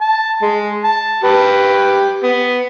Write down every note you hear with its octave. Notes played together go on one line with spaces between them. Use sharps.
A5
G#3
A5
G4 B4
B3